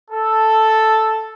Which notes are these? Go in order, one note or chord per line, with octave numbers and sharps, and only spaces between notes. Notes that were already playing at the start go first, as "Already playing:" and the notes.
A4